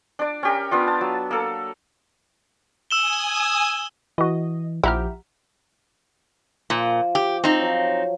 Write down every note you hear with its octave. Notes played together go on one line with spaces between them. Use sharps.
D4 D5
C#4 G4 A#4
B3 D4 F4
A5
F#3
A#3 A4
G#5 D#6 E6 E7 G7
E3 E4 F#4 D#5
A#1 F3 E4 G4 F#5 A#5 F6
A#2 F3
G4
C4 D#4 F5
F3 F#3 C#6